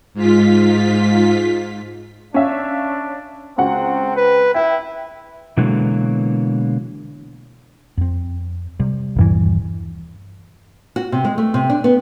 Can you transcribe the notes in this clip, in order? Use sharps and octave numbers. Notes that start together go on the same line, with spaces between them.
G#2 F4 B6
C#4 D4 E5 F5
C#2 C4 F#4 F#5
B4
E4 G5
B2 D3 E3 F#3 G#3 A#3
F2 C4
C3 G3
D#1 G2 E3
F#4
C3
G#3
A3
C3
D4
B3